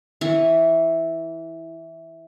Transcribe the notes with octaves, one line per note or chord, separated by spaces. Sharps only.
E3 E4 C#6